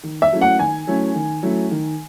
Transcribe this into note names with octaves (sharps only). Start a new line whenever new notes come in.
D#3
E5
F#3 A3 C#4 E4
F#5
D#3 G#5
F#3 A3 C#4 E4
D#3
F#3 A3 C#4 E4
D#3